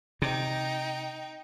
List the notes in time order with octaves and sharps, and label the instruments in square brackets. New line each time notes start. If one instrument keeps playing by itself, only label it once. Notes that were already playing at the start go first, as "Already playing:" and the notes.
[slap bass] C3 [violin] D#4 G5